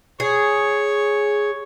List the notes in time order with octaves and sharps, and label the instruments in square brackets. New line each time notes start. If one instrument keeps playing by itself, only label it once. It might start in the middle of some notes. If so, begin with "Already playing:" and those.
[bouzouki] G#4 [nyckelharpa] C#5